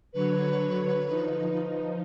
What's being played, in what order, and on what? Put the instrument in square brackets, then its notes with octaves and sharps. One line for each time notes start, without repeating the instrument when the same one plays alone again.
[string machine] D3 F#3 C#5 [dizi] B4
[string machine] F3 D#4